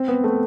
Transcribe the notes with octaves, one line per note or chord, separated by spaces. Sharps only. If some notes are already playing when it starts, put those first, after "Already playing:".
Already playing: C4
B3
A3